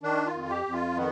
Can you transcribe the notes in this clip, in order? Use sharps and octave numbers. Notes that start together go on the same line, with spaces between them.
D#3 D4
F4
F2
G4
F2
F4
D#3 B3